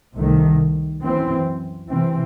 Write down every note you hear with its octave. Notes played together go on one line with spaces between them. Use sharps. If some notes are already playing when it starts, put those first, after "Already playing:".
C2 C3 D#3 A3
F#2 E3 C4
C3 E3 C4